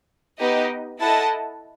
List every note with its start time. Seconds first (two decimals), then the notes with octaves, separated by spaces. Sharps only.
0.39 B3 D#4 G4 D#5
1.00 E4 A4 D#5 F#5 A5